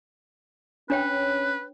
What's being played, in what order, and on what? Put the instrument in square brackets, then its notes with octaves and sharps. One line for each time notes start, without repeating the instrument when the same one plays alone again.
[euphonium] C#4 [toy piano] D4 C#5 G5 [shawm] B4